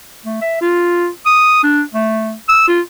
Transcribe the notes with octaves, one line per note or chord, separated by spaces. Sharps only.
A3
E5
F4
D#6
D4
A3
E6
F4